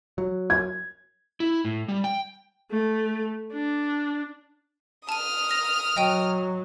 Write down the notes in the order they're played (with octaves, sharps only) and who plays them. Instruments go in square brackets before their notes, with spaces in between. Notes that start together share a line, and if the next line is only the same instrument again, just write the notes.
[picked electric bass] F#3
[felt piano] G#6
[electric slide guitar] E4
A2
G3
G5
[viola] A3
D4
[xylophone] A5 D#7 [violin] D#6 F6
[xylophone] A#6
[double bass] F#3 [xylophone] D#5 G5 D#7